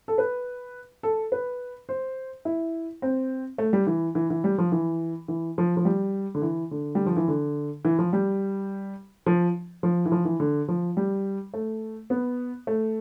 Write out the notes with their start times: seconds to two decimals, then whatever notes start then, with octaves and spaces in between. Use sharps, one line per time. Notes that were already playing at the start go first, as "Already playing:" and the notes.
0.08 A4
0.18 B4
1.03 A4
1.32 B4
1.89 C5
2.45 E4
3.02 C4
3.58 A3
3.73 G3
3.87 E3
4.15 E3
4.30 E3
4.44 G3
4.58 F3
4.72 E3
5.28 E3
5.58 F3
5.77 F3
5.85 G3
6.35 D3
6.42 E3
6.71 D3
6.95 G3
7.06 F3
7.17 E3
7.28 D3
7.85 E3
7.99 F3
8.13 G3
9.26 F3
9.83 F3
10.06 E3
10.12 F3
10.25 E3
10.40 D3
10.68 F3
10.97 G3
11.54 A3
12.10 B3
12.67 A3